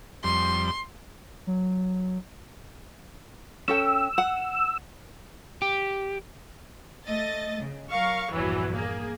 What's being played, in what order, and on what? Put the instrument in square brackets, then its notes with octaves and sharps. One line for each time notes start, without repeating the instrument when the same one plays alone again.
[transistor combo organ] F2 G3 [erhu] C6
[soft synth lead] F#3
[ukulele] C#4 A4 G5 [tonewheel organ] E6
[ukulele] F#5
[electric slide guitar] G4
[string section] A3 D#5 A6
C#3
F#3 A#4 F5 C#6
A#1 E2 G2 E3 F#3
A#3 G#4